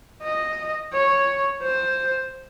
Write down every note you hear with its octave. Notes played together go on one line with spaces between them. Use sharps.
D#5
C#5
C5